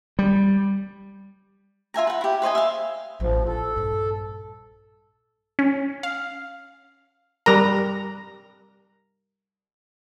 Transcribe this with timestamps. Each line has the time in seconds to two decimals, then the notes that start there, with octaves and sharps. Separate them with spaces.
0.19 G3
1.94 F4 E5 G#5 A#5
2.07 B4 F#5
2.21 E4 G4
2.42 B4 C5 D#5 G#5
2.55 E5 F5
3.20 A1 F3
3.47 E4 A4
3.76 A#1 G2
5.59 C#4
6.03 F5
7.46 G3 A#4 A#5